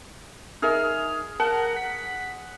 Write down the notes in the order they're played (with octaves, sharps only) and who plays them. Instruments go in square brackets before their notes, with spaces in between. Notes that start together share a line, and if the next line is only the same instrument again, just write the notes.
[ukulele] D#4 A#4 E5 [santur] G#4 [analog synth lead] F6
[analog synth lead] A#4 [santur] F#5 [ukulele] A5
[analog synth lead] B6